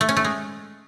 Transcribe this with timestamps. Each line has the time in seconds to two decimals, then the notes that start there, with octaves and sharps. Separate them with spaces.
0.01 A3
0.09 C#4
0.17 A3
0.24 G#3